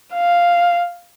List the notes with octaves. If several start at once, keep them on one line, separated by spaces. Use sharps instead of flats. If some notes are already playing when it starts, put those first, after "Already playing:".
F5